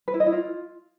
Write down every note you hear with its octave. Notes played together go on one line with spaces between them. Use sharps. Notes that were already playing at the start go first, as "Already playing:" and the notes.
B4
E4
D#5
E4
F4